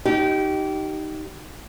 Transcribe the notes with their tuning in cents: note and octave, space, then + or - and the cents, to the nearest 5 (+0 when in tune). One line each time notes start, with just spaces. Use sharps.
D#4 +0 G4 -25